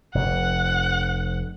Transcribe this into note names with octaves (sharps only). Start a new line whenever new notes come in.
F1 F2 F#5